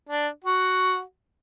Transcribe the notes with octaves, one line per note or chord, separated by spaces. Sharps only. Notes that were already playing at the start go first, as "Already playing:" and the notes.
D4
F#4